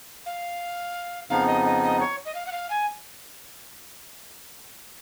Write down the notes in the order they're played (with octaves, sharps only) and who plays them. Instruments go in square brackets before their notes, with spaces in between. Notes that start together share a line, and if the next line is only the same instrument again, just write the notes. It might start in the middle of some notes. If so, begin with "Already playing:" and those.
[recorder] F5
[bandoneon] F2 C#3 F3 B3 D#4 [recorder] F5
[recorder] D#5
D#5
D#5
C#5
D#5
F5
F#5
F5
G#5